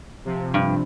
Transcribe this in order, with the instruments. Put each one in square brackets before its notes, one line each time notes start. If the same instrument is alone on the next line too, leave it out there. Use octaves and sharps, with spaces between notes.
[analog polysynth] C3 F3
[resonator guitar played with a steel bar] G2